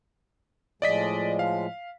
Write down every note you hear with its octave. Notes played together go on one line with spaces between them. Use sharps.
A2 F3 G#3 D5 D#5 B6
F5